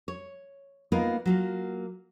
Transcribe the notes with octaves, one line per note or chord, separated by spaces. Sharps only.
C#5
A#3 B3 D#4 F4 A#4 D#5
F#3 A#3 F4